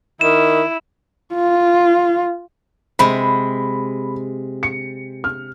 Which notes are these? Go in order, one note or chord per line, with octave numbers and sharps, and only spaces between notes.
D#3 E4 E7
F4
C3 G#3 B5
C#7
F6